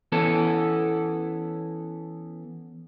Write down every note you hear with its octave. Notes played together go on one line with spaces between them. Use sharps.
E3 B3 C#4 A4